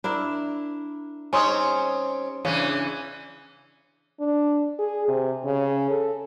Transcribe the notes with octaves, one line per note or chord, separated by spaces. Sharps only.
D4 E4 A#4
G3 C4 C#4 D#4 C#5 G#5 C6 D#6
E2 C#3 E3 C#4 D4
D4
G#4
C3
C#3
A4